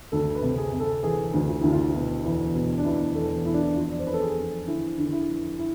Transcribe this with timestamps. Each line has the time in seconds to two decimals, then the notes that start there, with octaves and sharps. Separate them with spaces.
0.12 D2 A4
0.35 B4
0.42 C3
0.57 G#4
0.73 C3
0.80 A4
1.03 E3 G#4
1.33 D2
1.48 F4
1.61 D2 E4
1.72 F4
1.93 B2 E4
2.24 E2 E4
2.54 B2
2.78 D4
2.84 B2 E4
3.15 E2 A4
3.45 E2 E4
3.54 D4
3.61 E4
3.76 F2 F4
3.92 D5
3.99 C5
4.06 F2 B4
4.14 A4
4.22 G#4
4.37 F2
4.67 D3 E4
4.98 D3
5.12 E4
5.28 F2
5.59 E4